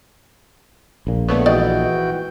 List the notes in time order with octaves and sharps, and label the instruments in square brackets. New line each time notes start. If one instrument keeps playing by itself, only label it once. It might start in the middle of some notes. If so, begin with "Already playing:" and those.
[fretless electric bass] A#1 A#2
[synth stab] D3 A3 B3 [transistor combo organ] C#5
[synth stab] G#2 [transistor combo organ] E3 F#4 G5 [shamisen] D5 D#5